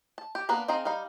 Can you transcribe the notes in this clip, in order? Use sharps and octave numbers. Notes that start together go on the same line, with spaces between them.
A5
G4
A#3 B3 D4 A#4 B4
C4 D#4 G#4 F5 A#5
G3 D#4 F5